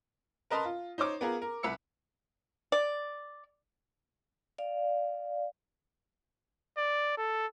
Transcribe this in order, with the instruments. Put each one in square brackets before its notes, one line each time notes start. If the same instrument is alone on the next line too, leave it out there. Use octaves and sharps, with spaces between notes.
[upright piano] A#4 B4 D#5 A5 A#5 C6
F4
D#4 C5 C#5 D6
B3 F4 G#4 A#4
A#4
C2 B4 E6 C#7
[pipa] D5
[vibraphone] D5 F5
[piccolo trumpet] D5
A4